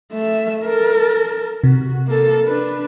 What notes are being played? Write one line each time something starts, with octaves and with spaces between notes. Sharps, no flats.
A3 E5
A4 A#4
C3 F#4
A#3 A4
D4 B4